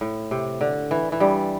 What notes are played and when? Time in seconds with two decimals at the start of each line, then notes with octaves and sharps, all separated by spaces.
0.01 A2
0.31 C3
0.61 D3
0.91 E3
1.12 E3
1.20 G2 G3